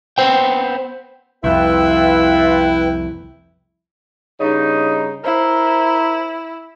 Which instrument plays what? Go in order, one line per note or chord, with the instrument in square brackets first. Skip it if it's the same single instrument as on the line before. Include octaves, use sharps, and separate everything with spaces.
[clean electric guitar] B3 C5 G5
[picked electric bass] C2 F2 [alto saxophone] E4 [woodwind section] F4 E5 [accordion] B4 G5
[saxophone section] G2 C#3 D#4
[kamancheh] E4 [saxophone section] A#4 C5